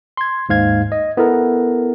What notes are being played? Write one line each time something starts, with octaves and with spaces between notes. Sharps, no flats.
C6 G#6
D#2 G#2 F5 G#6
D#5
B3 E4 A4 A#4